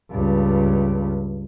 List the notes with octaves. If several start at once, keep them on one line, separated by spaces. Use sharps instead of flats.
C#2 G2